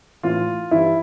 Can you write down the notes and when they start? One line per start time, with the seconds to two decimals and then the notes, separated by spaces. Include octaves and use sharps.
0.23 A2 E3 F4
0.71 G2 E3 E4